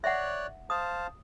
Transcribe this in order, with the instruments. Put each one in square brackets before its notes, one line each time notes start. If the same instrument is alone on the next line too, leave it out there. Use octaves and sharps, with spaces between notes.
[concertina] C#5 D5 F#6 [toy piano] E5 F#5
[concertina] C5 F5 A5 [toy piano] D#6